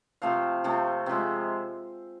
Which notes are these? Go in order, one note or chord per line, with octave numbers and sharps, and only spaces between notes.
C3 F3 A3 F5
C3 F3 A3
C3 F3 G#3 E5